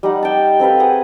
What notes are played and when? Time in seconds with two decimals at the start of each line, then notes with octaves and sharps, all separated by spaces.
0.03 G3 D#4 F#5
0.23 G5 A5
0.60 C4 A4 B4 F5
0.80 G#4 F#5 D#6